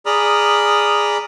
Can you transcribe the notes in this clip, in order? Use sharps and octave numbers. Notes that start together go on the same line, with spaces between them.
G#4 D5 A#5 B5 D#6 F6